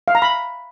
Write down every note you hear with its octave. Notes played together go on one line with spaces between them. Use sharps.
F5
A#5
B5